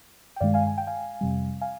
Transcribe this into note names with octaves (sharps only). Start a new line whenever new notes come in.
G5
G2 D#3 G#3 D5 F5
F5 G#5
G#5
G5
F5 G#5
F2 C3 G3
F5 G#5